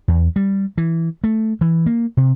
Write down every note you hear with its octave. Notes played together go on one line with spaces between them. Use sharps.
E2
G3
E3
A3
E3
A#3
C3